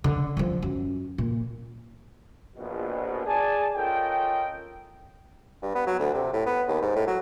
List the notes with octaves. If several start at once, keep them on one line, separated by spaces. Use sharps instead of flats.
D3
D3 F3
F#2
A#2
A#1 B2
G#4 D5 G#5 A5
C#4 F4 A4 A#4 D#5 G5
G2
B3
F#3
D2
C3
A2
B3
D#2
G#2
A2
F#3